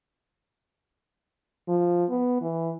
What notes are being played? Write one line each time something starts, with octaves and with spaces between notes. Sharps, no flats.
F3
B3
E3